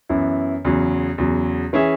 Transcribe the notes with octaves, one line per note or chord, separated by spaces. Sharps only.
F#2 E3 B3 E4
E2 C#3 F#3
E2 C#3 F#3
E3 C#4 G#4 E5